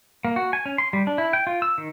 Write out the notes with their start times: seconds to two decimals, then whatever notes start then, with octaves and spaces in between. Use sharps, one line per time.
0.25 A#3
0.36 F#4
0.53 G#5
0.66 C#4
0.78 C6
0.93 G3
1.07 D4
1.18 E4
1.33 G5
1.47 F4
1.62 E6
1.78 D#3